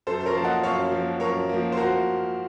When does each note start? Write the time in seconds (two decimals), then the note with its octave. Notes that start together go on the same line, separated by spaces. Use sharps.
0.07 F#2 A4 C5
0.20 C5
0.25 A#4 C#5
0.35 F3 A#3 A5
0.44 D#5 F#5
0.63 F#2 C#5 F5
0.92 F3 A#3
1.20 F#2 A#4 C#5
1.49 F3 A#3
1.72 C5
1.77 F#4 A#4